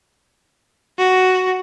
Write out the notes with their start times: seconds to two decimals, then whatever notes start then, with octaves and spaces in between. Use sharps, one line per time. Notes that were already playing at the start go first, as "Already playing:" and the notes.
0.98 F#4